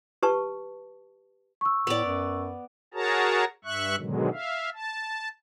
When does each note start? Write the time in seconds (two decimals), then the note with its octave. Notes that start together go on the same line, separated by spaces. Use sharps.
0.23 G4 B4 A5 C#6
1.61 C#6 E6
1.87 A2 B3 D5
2.05 F#2
2.94 F#4 G#4 A#4 C#5 A5 A#5
3.65 G2 E5 C#6 F#6
3.98 G#2 B2 D3 D#3 F#3 G#3
4.32 E5 F5
4.74 A5